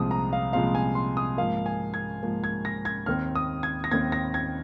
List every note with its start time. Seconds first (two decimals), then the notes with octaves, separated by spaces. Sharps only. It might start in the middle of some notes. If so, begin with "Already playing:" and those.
Already playing: C2 A#2 F3 G#3 C4 D#6
0.11 A#5
0.33 F5
0.53 C2 A#2 F3 G#3 C4 F5
0.75 G#5
0.95 C6
1.17 D#6
1.38 G#2 F3 A#3 F5
1.66 G#5
1.94 G#6
2.23 G#2 F3 A#3
2.44 G#6
2.65 A#6
2.85 G#6
3.06 D#2 D#3 C4 F6
3.35 D#6
3.63 G#6
3.84 A#6
3.91 D#2 D#3 C4 G#6
4.12 A#6
4.34 G#6